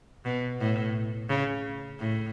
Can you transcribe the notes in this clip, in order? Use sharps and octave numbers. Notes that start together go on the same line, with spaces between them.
B2
A2
C#3
A2